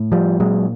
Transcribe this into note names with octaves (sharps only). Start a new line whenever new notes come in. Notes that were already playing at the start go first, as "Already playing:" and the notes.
Already playing: A2
F3 G3
A#2 F#3 G#3